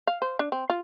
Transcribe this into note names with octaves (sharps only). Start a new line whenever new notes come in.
F5
C5
D4
C4
F4